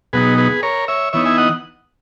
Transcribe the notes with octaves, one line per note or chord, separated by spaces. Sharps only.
B2 F#3 B3 D#4 G#4 B4
G#4 B4
A#4 C#5
C#5 E5
E3 B3 D#4 C#5 E5
E5 G#5
D#5 F#5